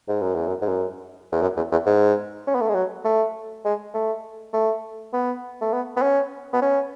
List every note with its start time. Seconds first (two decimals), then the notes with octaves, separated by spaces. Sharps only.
0.08 G#2
0.21 F#2
0.35 E2
0.47 F#2
0.61 G#2
0.68 F#2
1.32 E2
1.42 F#2
1.57 E2
1.72 E2
1.86 G#2
2.47 C#4
2.55 B3
2.61 A3
2.68 G#3
2.75 F#3
3.05 A3
3.65 G#3
3.94 A3
4.53 A3
5.13 B3
5.61 A3
5.73 B3
5.97 B3
6.02 C#4
6.53 B3
6.62 C#4